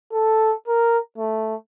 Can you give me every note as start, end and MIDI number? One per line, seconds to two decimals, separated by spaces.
0.12 0.54 69
0.68 0.98 70
1.18 1.55 57